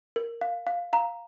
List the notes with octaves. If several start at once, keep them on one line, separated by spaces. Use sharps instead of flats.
A#4
F5
F5
F5 A#5